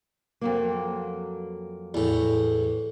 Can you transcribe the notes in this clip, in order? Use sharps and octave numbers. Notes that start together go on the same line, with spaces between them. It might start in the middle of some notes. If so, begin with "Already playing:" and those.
F2 F#3 A#3
E2 A2